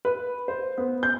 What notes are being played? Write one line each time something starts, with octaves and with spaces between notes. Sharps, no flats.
B4
C5
B3
G6